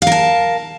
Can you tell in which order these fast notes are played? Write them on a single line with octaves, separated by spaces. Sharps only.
F5 A#4 A5